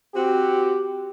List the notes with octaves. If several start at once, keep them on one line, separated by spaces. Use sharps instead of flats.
C4 F#4 G4